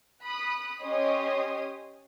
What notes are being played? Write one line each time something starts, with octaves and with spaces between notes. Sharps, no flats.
B5 D#6 F#6
C#4 G4 C#5 D#5 C6 D#6